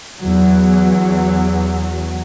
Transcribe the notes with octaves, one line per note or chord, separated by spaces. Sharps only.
E2 F#3